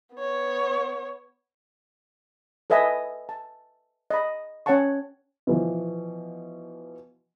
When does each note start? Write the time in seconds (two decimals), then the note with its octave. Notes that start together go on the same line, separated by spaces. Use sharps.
0.15 B3 C#5
2.70 A4 B4 D#5 E5 G#5
3.29 A5
4.10 D#5 B5
4.66 C#4 C#5 F#5 G5 A5 C#6
5.47 B2 E3 F3